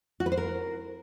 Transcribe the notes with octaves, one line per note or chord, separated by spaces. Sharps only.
F#4
B4
C5
A#4